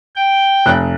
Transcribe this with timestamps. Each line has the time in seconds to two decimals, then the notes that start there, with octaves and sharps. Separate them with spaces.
0.16 G5
0.66 F1 F#6